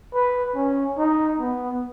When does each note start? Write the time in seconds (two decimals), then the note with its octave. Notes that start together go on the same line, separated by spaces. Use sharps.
0.14 B4
0.55 C#4
0.98 D#4
1.40 B3